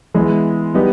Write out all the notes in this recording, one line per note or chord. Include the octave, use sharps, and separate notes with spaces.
E3 G#3 B3
G3 B3 D#4 G4